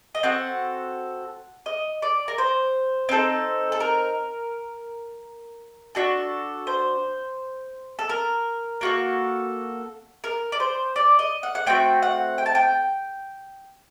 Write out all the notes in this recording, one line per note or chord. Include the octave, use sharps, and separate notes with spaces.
D#5
C4 F#4 A4 F#5
D#5
D5
A#4
C5
C4 D#4 A4
A4
A#4
D4 F#4 A4
C5
A4
A#4
A#3 F#4 A4
A#4
D5
C5
D5
D#5
F#5
F#5
A3 C4 F#4 G5
F#5
G5
A5
G5